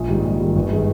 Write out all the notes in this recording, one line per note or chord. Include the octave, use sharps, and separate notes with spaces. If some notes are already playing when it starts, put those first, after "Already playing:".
Already playing: A#1
G#2 D#3 G3
A#1
G#2 D#3 G3
G1
D#3 G#3